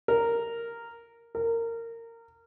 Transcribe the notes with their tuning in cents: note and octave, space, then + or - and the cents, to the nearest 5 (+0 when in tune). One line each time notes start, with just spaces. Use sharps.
A#4 -5
A#4 -20